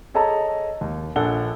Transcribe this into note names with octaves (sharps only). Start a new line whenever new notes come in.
G#4 A4 C#5 D#5 A5 A#5
D#2
A#1 D4 A4 F#5 G7